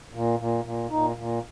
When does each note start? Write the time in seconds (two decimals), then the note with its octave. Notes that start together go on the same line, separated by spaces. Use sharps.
0.13 A#2
0.39 A#2
0.65 A#2
0.90 A#2 D#4
1.16 A#2